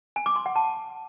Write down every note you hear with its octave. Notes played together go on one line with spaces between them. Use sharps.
G#5
D6
C6
F#5
A5